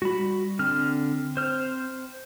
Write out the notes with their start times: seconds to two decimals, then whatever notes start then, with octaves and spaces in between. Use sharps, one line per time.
0.02 G3 F#4 B5
0.59 D3 C4 F6
1.37 C5 F6